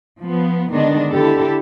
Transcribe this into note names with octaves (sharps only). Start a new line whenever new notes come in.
F3 B3
D3 D#3 G#3 B3 D4 D#5
D3 E4 G4 A4